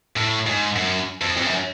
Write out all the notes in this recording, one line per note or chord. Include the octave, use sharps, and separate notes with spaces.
A2
G#2
F#2
F2
F2
F#2